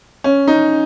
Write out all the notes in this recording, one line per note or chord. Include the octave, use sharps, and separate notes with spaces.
C#4
D#4